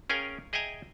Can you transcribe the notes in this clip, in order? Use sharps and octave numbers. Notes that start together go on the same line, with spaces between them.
C#4 G#4 A#4 F5 G5 G#5
G#4 D#5 E5 G5 G#5 A#5